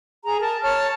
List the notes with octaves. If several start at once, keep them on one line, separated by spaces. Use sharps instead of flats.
G#4 A#5
A#4 A5
C#5 A5 F6